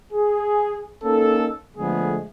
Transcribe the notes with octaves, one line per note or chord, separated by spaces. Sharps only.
G#4
A#3 C#4 D#4 A4
D3 F3 G#3 A3 B3 G#4